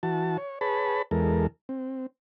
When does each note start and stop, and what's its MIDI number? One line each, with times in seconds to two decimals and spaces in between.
0.03 0.37 52
0.03 0.37 66
0.03 0.37 81
0.38 0.59 73
0.61 1.02 68
0.61 1.02 71
0.61 1.02 73
0.61 1.02 81
0.61 1.02 83
1.11 1.47 40
1.11 1.47 56
1.11 1.47 69
1.11 1.47 70
1.69 2.06 60